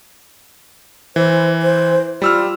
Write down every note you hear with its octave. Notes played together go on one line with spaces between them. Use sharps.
E3 C5
C5
G3 F4 E6 F6